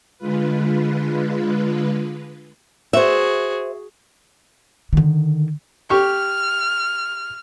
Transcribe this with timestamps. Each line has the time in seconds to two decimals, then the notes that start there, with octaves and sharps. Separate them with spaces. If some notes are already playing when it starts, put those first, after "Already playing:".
0.18 D3 G#3 F4 B4
2.93 F#4 G#4 C5 E5
4.93 D3 D#3
5.90 G4 C#6 F6